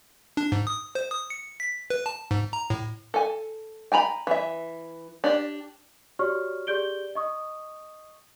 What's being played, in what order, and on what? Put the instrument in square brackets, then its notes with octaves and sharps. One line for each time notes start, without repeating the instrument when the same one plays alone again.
[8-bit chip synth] D4
G#2
D#6
C5
D#6
C#7
B6
B4
A5
G#2
A#5
A2
[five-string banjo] A4 G#5
G5 G#5 A#5 B5
E3 E5
D4 G4 D5
[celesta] F#4 G4 C#5 D5 C#6 F6
G4 G#4 D5 G6 D7 G7
D#5 C#6 D#6